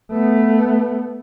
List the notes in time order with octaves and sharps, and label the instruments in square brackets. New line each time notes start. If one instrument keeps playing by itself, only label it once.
[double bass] A3 B3